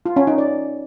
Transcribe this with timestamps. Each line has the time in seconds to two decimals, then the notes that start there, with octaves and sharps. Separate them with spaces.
0.06 F4
0.16 C#4
0.27 D#4
0.38 D5